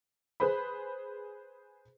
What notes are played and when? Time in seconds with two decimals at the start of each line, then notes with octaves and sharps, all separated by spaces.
0.40 G#4 B4 C5 B5